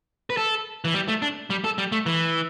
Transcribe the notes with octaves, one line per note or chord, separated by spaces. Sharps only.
B4
A4
E3
G3
A3
D4
G3
A4
G3
A3
E3